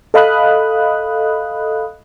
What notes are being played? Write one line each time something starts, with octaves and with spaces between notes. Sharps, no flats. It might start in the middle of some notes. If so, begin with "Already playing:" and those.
A4 D#5 F5 B5 D#6 F#6